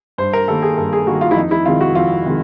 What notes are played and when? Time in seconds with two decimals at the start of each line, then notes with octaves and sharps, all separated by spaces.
0.18 G2 C5
0.33 A#4
0.48 D#3 G3 A#3 A4
0.62 G#4
0.77 G2 A4
0.93 G#4
1.07 D#3 G3 A#3 F#4
1.21 F4
1.31 E4
1.36 F2 D#4
1.51 E4
1.65 C3 D#3 G#3 F4
1.81 F#4
1.95 F2 F4
2.25 C3 D#3 G#3